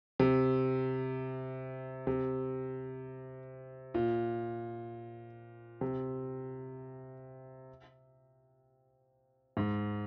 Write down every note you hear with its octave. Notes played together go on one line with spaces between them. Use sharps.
C3
C3
A#2
C3
G#2